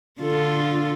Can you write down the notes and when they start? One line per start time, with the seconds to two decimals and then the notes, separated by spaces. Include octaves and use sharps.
0.21 D3 F4 A4